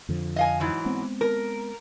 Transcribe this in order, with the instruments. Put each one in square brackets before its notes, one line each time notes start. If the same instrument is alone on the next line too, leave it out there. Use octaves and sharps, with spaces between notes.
[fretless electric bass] F2 D3 F3
[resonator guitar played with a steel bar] D#5 F5 G#5
G#2 E3 F#3
[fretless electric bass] G#3 B3 C4
[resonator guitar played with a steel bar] A#4